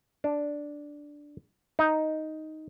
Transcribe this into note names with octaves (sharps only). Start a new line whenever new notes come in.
D4
D#4